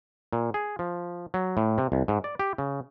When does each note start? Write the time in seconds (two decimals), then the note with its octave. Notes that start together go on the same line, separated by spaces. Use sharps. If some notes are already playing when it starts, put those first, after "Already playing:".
0.33 A#2
0.54 G#4
0.79 F3
1.34 F#3
1.57 A2
1.78 C3
1.92 C2
2.08 G#2
2.24 D5
2.39 G4
2.58 C#3